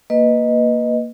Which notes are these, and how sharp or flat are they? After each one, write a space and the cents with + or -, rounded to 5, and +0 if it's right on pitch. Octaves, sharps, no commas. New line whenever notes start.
A#3 +0 B4 +0 D#5 +0